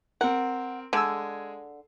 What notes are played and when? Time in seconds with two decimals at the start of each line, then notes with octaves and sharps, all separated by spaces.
0.21 C4 A#4 F#5
0.93 D3 G#3 G#5 E6